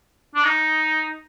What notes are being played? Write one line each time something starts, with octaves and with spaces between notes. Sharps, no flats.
D4
D#4